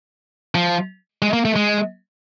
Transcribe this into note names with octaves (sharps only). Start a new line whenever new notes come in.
F3
G#3
A#3
A3
G#3